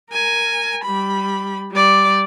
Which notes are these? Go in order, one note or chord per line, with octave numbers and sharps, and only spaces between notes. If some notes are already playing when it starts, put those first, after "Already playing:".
A#4 G#5
G3 B5
G3 D5